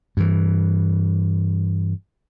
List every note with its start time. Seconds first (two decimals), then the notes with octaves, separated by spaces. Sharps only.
0.17 G2 E3